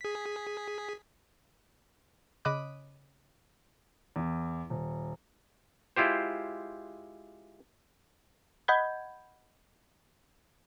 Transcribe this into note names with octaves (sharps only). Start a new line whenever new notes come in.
G#4 B6
C#3 D#5 B5 D6 D#6 F#6
E2
D#1
G#3 E4 F4 G4 C5
D#5 F#5 B5 G6 G#6